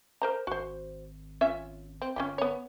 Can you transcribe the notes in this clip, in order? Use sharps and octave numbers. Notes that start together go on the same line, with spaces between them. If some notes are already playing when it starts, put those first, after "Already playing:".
A#4 C5 A#5
G#1 F#4 C5
C#4 F4 E5
C4
G1 C#4 F4 G4
B3 C#5